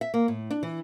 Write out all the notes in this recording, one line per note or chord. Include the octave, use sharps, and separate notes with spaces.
E5
A#3
A2
D4
E3